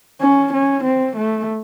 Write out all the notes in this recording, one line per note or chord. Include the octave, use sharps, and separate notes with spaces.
C#4
C#4
C4
A3